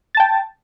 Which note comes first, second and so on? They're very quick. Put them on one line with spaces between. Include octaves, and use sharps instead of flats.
A6 A5 G5